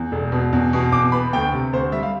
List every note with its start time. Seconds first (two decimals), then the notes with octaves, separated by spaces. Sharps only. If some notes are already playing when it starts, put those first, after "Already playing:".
Already playing: E2
0.12 E1
0.32 B2
0.53 E2
0.73 B2
0.92 E2 D6
1.12 B3 B5
1.33 D2 G5
1.52 C3
1.73 D2 C5
1.92 G3 E5
2.03 F5